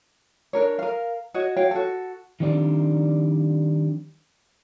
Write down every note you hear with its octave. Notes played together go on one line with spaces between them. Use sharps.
D4 A#4 C#5
A#4 F5
F#4 C#5 D#5
F#4 C#5 F5 G5
F#4 A4
D#3 F3 G3 C4 D4 D#4